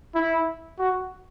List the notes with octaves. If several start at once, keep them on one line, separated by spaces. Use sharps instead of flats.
E4
F#4